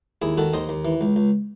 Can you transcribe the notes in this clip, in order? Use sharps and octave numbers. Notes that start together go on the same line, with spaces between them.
D#2 E4 G#4
D#3 F#4 A4
D#2 C5 D#5
D#2
E3
C#2
C#2